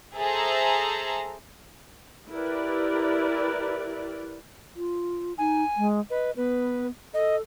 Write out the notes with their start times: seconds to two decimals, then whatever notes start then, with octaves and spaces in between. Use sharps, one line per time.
0.16 G#4 A4 C5 E5 A#5
2.30 E4 G4 A#4 B4 D5
4.76 F4
5.38 D#4 G#5
5.77 G#3
6.10 B4 D#5
6.37 B3 B4
7.14 A4 D#5